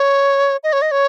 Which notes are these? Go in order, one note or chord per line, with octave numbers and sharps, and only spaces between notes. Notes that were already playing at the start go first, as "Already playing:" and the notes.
Already playing: C#5
D#5
C#5
D#5
C#5